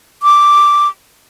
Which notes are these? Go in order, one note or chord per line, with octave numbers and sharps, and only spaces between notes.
D6